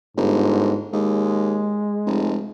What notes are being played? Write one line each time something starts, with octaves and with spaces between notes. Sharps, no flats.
G1 G#2
D#2 G#3
F1